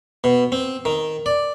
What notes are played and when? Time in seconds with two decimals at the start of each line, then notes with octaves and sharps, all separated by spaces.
0.24 B2
0.52 C4
0.85 D#3
1.26 D5